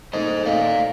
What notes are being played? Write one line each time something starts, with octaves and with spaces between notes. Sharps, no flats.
A#2 A3 D#4 C5 D#5
A#2 A3 D#4 D5 F5